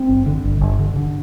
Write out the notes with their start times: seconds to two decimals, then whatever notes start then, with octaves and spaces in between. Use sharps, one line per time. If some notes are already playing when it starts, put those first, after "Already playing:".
Already playing: C4
0.09 G1
0.26 D3
0.44 G1
0.61 G1
0.79 D3
0.96 D3